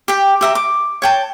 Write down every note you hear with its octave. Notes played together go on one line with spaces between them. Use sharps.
G4 G5
G4 E5 A#5
D6
C#5 G5 A5